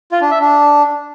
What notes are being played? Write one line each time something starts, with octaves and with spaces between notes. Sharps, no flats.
F4
D4
E5
D4